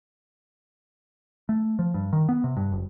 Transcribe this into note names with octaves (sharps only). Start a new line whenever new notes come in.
A3
F3
G2
D#3
B3
C3
G2
F#1